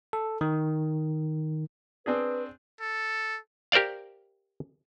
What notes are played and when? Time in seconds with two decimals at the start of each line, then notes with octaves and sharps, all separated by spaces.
0.13 A4
0.41 D#3
2.06 C4 D4 G#4 B4
2.81 A4
3.72 G4 A#4 C5 D5 F5